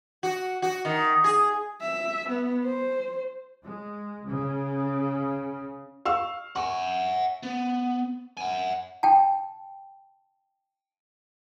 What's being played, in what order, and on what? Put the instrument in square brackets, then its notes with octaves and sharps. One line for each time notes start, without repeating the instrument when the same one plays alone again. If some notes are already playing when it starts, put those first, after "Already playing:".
[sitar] F#4
F#4
D#3
G#4
[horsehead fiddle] E5
B3
C5
[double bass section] G#3
C#3
[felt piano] F5 C#6 E6
[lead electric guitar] F#5 G#5 [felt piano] C#6
[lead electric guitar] B3
F#5 G#5
[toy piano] G5 A5